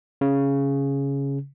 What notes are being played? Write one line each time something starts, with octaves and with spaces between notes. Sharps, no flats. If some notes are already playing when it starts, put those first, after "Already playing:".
C#3